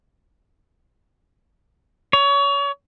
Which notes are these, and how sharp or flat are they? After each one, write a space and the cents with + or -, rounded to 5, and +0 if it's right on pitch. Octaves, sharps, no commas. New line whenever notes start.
C#5 +30